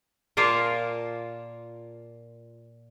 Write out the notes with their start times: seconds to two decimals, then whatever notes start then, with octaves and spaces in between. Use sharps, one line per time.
0.37 A#2 A#3 F4 A#4 A5